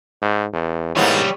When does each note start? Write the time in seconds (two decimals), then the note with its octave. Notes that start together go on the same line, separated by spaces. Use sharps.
0.22 G#2
0.53 E2
0.96 G#2 G3 A#3 B3 E4 C#5